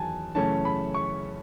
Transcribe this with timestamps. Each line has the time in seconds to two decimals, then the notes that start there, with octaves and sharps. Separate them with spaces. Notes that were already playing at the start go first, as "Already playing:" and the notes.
Already playing: E2 D#3 F#3 G#5 A5
0.35 F#2 C#3 E3 A3 C#4 A5
0.65 B5
0.94 C#6